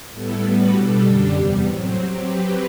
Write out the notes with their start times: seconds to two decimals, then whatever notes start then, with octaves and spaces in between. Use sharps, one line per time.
0.12 A2 G3 B3 E4 A4
0.42 A2 G3 B3 F#4 B4
0.73 B2 G3 D4 A4
1.02 F#2 D3 G3 D4 G4
1.33 E2 C3 G3 B3
1.63 A2 F#3 C4
1.94 F#3 C4 G4
2.23 F#3 C4 G4 B4